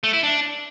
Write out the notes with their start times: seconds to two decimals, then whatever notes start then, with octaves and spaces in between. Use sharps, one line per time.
0.04 A3
0.13 E4
0.23 D4